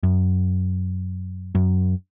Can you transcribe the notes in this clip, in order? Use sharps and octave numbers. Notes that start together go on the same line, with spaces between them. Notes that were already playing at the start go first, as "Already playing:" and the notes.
F#2
F#2